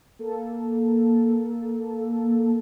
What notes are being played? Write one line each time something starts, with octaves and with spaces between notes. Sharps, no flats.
A#3 A4